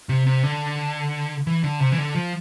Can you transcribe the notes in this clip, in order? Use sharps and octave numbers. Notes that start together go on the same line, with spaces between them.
C3
C3
D3
E3
D3
C3
E3
D3
F3